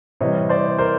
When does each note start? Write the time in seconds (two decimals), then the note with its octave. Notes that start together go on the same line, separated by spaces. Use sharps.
0.21 C3 E3 G3 C#5 D#5
0.49 C5 D5
0.78 A#4 C5